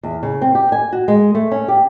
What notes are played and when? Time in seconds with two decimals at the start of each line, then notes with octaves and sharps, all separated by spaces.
0.03 E2
0.23 C#3
0.41 C4
0.55 G4
0.72 G#5
0.93 F#4
1.08 G#3
1.35 A3
1.51 C#4
1.68 G4